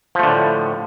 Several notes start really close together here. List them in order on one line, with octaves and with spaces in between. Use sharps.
F3 A3 D3 A2